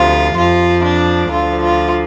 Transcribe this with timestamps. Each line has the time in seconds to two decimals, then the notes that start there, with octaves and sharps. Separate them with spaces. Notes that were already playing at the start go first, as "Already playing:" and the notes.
Already playing: D2 C3 F3 F4
0.37 F2 F3 F4
0.84 D4
1.32 D2 D3 F3 F4
1.63 F4